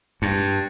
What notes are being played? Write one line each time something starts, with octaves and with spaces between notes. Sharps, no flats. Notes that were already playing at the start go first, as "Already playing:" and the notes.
G2